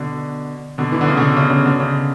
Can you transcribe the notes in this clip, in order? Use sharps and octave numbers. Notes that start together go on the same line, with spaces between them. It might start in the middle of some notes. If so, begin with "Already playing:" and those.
Already playing: B2 D3
B2 D3
E3
D3
C#3
B2 D3
C#3
C#3
B2 D3
C#3